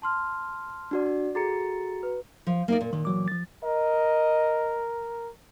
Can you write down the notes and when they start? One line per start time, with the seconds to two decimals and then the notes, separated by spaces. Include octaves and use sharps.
0.02 A5 C6 F6
0.91 D4 F#4 D5
1.35 F#4 G#4 A4 A#5 A6 C#7
2.03 B4
2.47 F3
2.68 A#3 D#4 D5
2.81 A#2
2.93 A#2 D#3
3.05 E3 F#3 D6
3.28 F3 A6
3.64 A#4 D#5